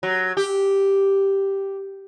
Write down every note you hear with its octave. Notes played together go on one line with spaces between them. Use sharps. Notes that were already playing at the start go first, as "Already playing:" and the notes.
F#3
G4